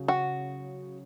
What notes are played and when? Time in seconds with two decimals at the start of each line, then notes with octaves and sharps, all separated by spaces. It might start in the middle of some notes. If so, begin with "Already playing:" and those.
Already playing: C#3 F#3 C#4
0.08 F#4